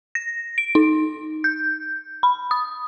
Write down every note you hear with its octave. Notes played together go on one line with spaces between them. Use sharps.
A#6
D7
D#4
G6
B5
D#6